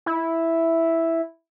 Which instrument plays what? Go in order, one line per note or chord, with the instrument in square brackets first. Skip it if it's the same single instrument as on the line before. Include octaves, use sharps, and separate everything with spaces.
[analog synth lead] E4